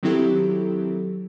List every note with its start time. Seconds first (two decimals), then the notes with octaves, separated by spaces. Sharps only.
0.03 D#3 F#3 C4 E4 G4 A4